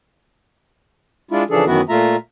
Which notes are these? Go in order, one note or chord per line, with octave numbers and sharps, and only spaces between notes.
G#3 D4 E4 F4
C#3 E3 F3 D4 G#4 A4
F#2 D#3 E3 B3 E4 F#4
A#2 A3 F4 E5 A#5